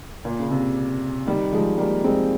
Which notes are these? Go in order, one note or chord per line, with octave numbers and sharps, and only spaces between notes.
A#2
C#3
C3
D#3 G3
F3 G#3
G3 A#3
G#3 C4